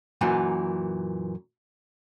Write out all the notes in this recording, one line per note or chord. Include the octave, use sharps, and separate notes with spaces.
F#2 A#2 E3